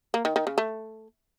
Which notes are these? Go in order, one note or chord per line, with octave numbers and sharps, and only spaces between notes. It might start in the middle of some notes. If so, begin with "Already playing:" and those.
A#3
D#3
D#3
C#3
A3